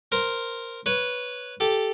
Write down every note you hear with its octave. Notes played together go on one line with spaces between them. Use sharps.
A#4 C5
B4 C#5
G4 A4